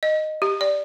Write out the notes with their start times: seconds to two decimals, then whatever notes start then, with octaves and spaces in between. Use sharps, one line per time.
0.03 D#5
0.42 G4
0.61 D5